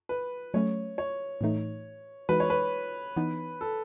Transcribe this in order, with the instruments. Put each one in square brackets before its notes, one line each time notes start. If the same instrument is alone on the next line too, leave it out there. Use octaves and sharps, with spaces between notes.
[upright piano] B4
[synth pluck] F#3 A3 C#4 [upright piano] C#5
[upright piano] C#5
[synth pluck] A2 E3 A3 D#4
[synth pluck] E3 G#3 D#4 F#4 [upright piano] B4
[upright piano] C#5
B4
[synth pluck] E3 B3 D#4
[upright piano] A4